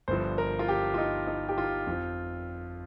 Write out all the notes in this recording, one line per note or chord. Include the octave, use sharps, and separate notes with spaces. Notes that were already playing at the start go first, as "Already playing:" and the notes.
G1 G2 F3 C5
A#4
F4
G4
F4
D#4
D#4
G4
F4
F2 F3